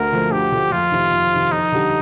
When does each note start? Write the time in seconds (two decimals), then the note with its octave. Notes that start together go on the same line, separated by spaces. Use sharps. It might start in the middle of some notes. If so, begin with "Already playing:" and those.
Already playing: D2 A#4
0.12 D3 F3 A3
0.32 D2 G4
0.51 D3 F3 A3
0.71 F2 F4
0.91 C3 D#3
1.12 F2
1.32 C3 D#3
1.51 F2 D#4
1.72 D3 G3